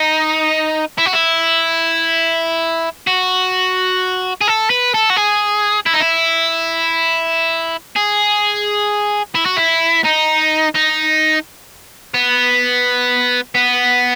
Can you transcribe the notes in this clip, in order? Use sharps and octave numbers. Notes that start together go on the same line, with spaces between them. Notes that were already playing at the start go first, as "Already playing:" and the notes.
Already playing: D#4
E4
F#4
E4
F#4
G#4
A4
B4
A4
F#4
G#4
E4
D#4
E4
G#4
E4
F#4
E4
D#4
D#4
B3
B3